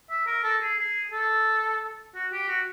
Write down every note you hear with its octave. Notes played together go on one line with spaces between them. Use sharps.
E5
A#4
A4
G#4
G#4
A4
F#4
G4
F#4